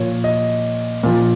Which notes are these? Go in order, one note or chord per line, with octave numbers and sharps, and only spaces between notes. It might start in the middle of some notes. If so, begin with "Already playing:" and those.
Already playing: A#2 F3 C#5
D#5
A#2 F3